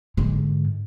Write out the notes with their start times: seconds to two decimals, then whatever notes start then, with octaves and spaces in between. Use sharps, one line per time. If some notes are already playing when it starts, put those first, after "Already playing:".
0.17 G#2 D3